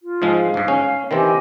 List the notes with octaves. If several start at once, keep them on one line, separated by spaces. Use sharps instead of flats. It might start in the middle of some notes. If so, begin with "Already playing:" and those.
F4
G#2 F3 G#3
F5
G1 G#2
C#4
D#3 E3 C4 G4 D#5 G#5